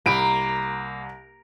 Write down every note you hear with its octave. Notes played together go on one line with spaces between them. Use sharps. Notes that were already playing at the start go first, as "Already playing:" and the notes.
C2 A#3 B5 D7